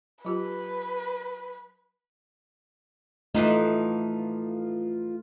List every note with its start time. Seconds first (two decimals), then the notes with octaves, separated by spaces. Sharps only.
0.25 F#3 F4 G4 B4
3.35 E3 F3 A3 D#4 F4